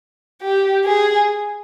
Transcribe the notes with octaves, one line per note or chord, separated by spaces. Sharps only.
G4
G#4